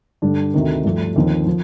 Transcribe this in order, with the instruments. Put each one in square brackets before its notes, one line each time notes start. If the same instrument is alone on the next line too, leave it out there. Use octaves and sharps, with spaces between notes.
[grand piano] G2 D3 G3 D4
D2 C3 D#3
G2 F3 A3
D#2 D3 F3 C4 D#4
F3